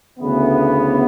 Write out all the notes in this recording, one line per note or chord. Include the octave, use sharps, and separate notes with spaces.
D2 C#3 E3 B3